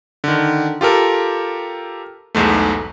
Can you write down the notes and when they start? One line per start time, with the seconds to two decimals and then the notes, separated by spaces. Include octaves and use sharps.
0.24 D3 D#3
0.81 F4 G4 A4 A#4
2.35 B1 E2 G#2 A3